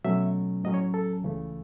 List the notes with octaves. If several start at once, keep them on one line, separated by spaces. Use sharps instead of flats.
B2 F#3 A3 C#4 E5
A2 F#3 C#4 D#5
C#5
A4
C#2 C#3 E3 A3